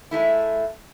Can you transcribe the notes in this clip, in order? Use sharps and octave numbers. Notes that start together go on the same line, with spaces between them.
G#3 A3 E4